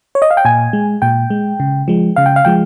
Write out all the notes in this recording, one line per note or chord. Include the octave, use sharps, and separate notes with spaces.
C#5
D#5
F5
G5
A#2 G#5
G#3
A#2 G5
G#3
C#3
F3 G#3
C#3 F5
G5
F5
F3 G#3 G5